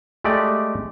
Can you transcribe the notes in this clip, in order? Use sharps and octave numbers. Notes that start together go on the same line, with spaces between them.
G#3 A3 G4 D5 D#5